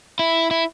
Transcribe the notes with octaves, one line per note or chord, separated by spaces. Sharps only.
E4
E4